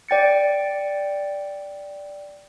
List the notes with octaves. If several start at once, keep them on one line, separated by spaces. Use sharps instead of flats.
D5 G5 A6 C#7